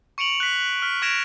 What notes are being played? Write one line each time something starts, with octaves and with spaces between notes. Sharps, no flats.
C#6 C#7 D7 F7 F#7
F#6 B6
F6 B6
C#6 G#6 A#6 D7 E7 F7